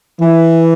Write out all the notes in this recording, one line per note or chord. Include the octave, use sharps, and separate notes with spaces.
E3